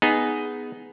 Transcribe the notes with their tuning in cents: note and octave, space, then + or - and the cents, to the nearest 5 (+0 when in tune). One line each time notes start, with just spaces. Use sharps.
B3 +0 D#4 +0 G#4 +0